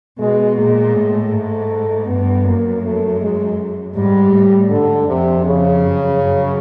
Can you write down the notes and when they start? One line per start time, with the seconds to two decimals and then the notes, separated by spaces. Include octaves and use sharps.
0.18 B2 G#3
0.57 A#2 G#3
0.94 A2
1.31 G#2 A3
2.06 G2 B3
2.45 F#2 A#3
2.83 A3
3.20 G#3
3.95 G#2 G3
4.32 A2
4.70 G#2 D3
5.07 F2 C3
5.45 C#3
5.83 F#2
6.20 F#2